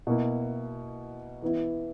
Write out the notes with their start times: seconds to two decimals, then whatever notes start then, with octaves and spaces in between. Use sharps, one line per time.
0.07 B2 A#3 E4
1.42 E3 B3 E4